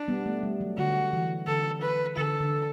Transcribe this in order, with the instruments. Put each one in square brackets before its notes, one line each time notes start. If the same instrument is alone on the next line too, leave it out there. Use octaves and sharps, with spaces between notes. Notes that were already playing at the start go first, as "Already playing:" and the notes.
Already playing: [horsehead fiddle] D4
[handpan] G3 B3
A3
G3
F#3
[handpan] D3 [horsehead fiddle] F#4
[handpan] E3
[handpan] D3 [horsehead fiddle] A4
[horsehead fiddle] B4
[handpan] D3 [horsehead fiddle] A4
[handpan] D3